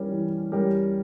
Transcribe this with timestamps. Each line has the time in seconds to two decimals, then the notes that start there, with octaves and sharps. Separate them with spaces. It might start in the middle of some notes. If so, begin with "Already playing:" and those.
Already playing: E3 G3 C#4 G4 A#4
0.10 E3
0.52 G3 C#4 G4 A#4